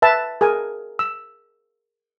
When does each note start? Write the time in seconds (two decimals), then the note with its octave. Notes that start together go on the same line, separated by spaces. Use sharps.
0.02 B4 E5 A5
0.41 G#4 A#4 G#5
0.99 E6